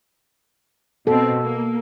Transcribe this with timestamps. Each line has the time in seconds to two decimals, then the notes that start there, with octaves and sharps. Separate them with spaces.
1.07 B2 C4 A4
1.41 A#3